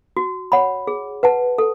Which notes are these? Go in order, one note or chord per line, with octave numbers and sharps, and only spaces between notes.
F#4
C#5 F#5 B5
G#4
B4 F#5 A5
A4